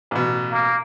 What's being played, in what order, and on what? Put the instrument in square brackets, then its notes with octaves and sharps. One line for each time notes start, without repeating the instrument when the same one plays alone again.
[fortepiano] A1 B2
[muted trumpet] A#3